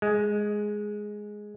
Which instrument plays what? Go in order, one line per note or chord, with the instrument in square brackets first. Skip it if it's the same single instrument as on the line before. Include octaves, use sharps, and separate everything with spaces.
[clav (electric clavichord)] G#3